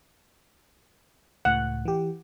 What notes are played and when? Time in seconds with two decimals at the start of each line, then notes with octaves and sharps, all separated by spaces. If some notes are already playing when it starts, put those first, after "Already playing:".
1.45 C#2 A2 F#5
1.85 E3 G4